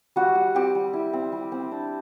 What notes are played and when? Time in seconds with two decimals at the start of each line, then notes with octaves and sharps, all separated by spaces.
0.16 G3 F#4
0.35 G3
0.55 C4 G4
0.75 G3
0.93 E4
1.13 C4
1.32 G3
1.52 C4
1.72 D4